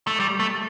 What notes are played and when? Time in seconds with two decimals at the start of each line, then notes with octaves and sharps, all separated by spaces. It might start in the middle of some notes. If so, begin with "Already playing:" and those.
0.07 A3
0.20 G3
0.40 A3